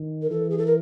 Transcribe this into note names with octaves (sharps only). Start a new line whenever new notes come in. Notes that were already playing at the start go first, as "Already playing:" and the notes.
Already playing: D#3
A#4
E3 A4
G#4
A4
A#4